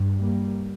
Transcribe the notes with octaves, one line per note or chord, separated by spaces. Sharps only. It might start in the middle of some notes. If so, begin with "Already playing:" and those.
Already playing: G2
G3 A#3